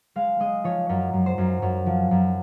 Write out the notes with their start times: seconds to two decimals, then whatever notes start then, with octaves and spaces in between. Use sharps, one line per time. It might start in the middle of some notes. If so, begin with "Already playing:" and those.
0.16 G#3 F5
0.40 G#3 D#5
0.64 F3 C#5
0.89 F#2 C#5
1.13 F#2
1.26 C5
1.38 F#2
1.62 F#2 C#5
1.86 F3
2.11 F#2